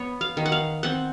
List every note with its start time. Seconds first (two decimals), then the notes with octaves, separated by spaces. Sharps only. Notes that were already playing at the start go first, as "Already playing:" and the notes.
Already playing: B3 C#5
0.21 F5
0.37 D#3
0.46 F#5
0.52 F5
0.83 C4 F#5